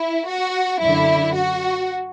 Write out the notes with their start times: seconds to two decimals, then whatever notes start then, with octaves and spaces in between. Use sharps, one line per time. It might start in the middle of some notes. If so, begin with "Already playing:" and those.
Already playing: E4
0.27 F#4
0.80 F#2 D3 E4
1.34 F#4